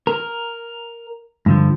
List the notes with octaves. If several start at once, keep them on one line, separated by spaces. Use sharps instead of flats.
A#4
G2 D3 F3